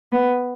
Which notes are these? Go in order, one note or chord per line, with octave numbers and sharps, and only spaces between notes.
B3